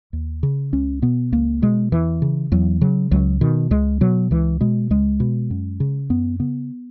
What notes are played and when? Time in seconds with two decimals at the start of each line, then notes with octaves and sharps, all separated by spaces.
0.13 D#2
0.43 C#3
0.73 C#2 C#4
1.02 B2 B3
1.32 C#2 A#3
1.62 B2 G#3
1.92 E2 E3
2.22 C#3
2.52 E2 F#3
2.81 C#3 F#3
3.11 C#2 F#3
3.41 B2 D#3
3.71 C#2 G#3
4.01 B2 F#3
4.31 C#2 E3
4.61 B2 G#3
4.90 C#2 G#3
5.20 B2
5.50 F#2
5.80 C#3
6.10 F#2 B3
6.40 C#3 B3